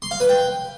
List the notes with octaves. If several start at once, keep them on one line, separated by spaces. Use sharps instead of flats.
C6
F5
B4
G5